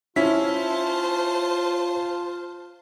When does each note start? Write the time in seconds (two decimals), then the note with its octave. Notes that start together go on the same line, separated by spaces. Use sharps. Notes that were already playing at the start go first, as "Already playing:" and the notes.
0.16 C#4 E4 F4 C5 A5 B6